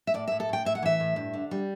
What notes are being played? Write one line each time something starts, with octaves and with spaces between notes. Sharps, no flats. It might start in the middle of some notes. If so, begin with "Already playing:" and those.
E5
A2 D5
E5
A2
A4
A2 G5
A2 E5
F#5
E3 E5
A2
G2
D3
G3